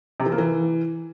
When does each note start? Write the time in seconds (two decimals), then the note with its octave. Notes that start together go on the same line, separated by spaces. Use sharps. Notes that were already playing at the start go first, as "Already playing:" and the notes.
0.20 C3
0.26 E3
0.32 A#3
0.38 E3